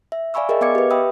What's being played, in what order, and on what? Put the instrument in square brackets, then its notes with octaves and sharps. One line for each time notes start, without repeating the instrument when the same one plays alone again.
[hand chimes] E5
D5 F5 G#5 B5 C#6 E6
G#4 A#4 D#5 E5 G5
B3 D#5 F5 D6 G#6 C#7
G4 B4
E5 G5 B5 D#6 E6